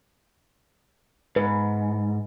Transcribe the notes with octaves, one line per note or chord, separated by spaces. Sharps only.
G#2 B4